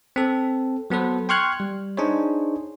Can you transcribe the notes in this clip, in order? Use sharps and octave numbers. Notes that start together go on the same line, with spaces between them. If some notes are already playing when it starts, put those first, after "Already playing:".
C4 A4
F#3 B3 A4 B4 C5
G5 C6 C#6 F6 F#6 G#6
G3
D4 D#4 G#4 C5 C#5